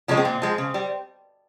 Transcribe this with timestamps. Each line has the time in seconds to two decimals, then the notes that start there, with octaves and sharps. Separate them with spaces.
0.08 C#3 F3 G#3 C#4
0.17 C4
0.25 A#2
0.42 F3 G#3
0.58 C#3
0.74 G3